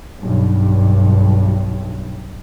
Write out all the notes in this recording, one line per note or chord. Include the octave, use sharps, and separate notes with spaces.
B1 G2